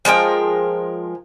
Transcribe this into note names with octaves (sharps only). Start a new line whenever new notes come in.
F3 G#3 A#4 G5